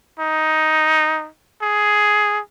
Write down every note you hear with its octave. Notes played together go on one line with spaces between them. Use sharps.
D#4
G#4